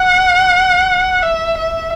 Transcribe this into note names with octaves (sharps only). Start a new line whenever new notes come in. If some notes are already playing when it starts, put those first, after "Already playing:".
Already playing: F#5
E5
E5